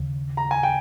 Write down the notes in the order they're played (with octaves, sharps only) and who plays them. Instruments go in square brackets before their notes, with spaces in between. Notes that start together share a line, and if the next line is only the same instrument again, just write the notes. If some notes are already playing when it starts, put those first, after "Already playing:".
Already playing: [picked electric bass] D#2 C#3
[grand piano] A#5
G#5
G5